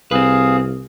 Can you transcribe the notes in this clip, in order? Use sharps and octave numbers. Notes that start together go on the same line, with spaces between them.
C2 C4 G#4 B4 F5